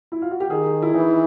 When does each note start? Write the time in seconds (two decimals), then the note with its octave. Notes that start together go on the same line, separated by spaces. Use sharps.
0.12 E4
0.22 F4
0.31 F#4
0.40 G4
0.49 D#3 G#4
0.82 E4
0.94 E3 D#4